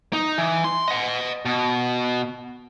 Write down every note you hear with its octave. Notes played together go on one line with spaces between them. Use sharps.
D#4
E3
C6
D#5 F#5
B2